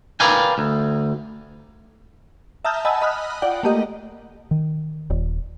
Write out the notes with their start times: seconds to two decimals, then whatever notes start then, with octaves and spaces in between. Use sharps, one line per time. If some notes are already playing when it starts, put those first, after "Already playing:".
0.20 A#4 B4 D5 F5 G5 G#5
0.58 D2
2.65 E5 A5 A#5 D#6 F6 G6
2.85 D#5 F#5 G#5 A5 B5 E6
3.02 D#5 B5 D#6 F6 F#6
3.42 F4 D5 F#5 G5
3.63 A3 A#3 G4 D#5
4.51 D#3
5.10 D#1